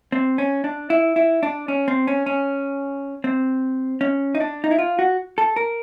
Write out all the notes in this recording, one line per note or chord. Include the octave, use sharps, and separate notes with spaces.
C4
C#4
D4
E4
E4
D4
C#4
C4
C#4
C#4
C4
C#4
D#4
D4
D#4
E4
F4
F#4
A4
A#4